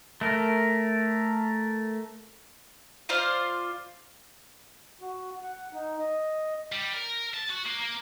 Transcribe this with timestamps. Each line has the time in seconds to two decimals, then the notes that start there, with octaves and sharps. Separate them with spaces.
0.21 A3 A#4
3.09 F4 C5 D5 F5
5.01 F#4
5.43 F#5
5.73 D#4
5.99 D#5
6.72 G3
6.93 A#4
7.34 A5
7.50 F#4
7.66 A#3
7.79 A#3